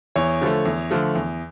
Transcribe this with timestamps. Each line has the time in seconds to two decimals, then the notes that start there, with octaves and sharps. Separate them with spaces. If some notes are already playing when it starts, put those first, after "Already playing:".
0.16 E2 C#5
0.41 D3 F3 A3
0.65 E2
0.91 D3 F3 A3
1.15 E2